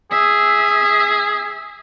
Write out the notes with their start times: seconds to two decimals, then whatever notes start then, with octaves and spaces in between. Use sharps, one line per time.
0.11 G#4 E5